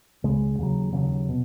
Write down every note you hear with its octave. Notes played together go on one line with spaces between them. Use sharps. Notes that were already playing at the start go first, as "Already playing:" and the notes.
C#2 C#3 G#3
D#2 C#3 F#3
D#2 C#3 F#3
B2